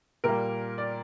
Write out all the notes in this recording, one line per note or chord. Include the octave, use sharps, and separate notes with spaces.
A#2 G3 A#3 A#4
D5